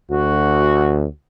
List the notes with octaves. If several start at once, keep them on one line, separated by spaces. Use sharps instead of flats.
D2 F#4